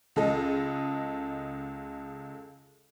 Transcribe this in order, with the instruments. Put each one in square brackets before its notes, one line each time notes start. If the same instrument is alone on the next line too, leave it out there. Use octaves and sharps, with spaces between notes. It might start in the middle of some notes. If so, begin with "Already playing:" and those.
[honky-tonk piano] C#2 G#3 A4 D#5